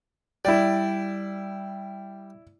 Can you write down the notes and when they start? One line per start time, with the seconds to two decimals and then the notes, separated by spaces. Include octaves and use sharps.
0.45 G3 E4 D5